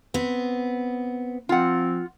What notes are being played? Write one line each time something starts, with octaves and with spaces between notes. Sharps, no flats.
B3 C4
F3 C4 F4 F#5